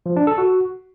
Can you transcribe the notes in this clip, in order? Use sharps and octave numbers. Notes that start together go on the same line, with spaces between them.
F3
D4
A4
F#4